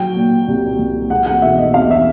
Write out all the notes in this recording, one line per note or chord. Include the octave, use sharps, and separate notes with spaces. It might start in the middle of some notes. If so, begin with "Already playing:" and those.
Already playing: F#3 G5
A#2
C2
C2
G#3 F#5
F#5
B2 E5
D#5
E2 F5
E5